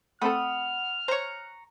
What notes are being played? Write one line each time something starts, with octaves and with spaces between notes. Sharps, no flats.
A3 C4 A4 F#5 B5 D#6 F6
C5 C#5 A#5 C#6 F#6